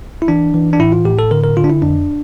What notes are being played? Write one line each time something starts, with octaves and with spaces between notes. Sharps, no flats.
E4
E3 D4
E3
D4
A2 E4
F4
A2 G4
A4
D3 A#4
A#4
D3 F4
D4
E4
F2 D4